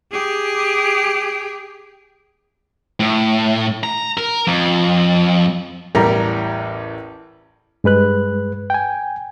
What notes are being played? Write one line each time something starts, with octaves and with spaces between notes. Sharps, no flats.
G4 G#4
A2
A#5
A#4
F2
A1 E2 G3 A#4 A#5
G2 G#3 B4 F#6
G5 G#5